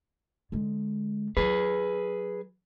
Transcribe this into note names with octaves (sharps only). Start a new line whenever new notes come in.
D3 G#3
F#3 G#4 B4